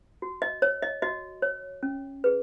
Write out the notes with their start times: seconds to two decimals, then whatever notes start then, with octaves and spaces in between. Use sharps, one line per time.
0.22 F#4
0.42 D#5
0.62 C#5
0.82 D#5
1.02 F#4 D#5
1.42 C#5
1.83 C#4
2.24 G#4 B4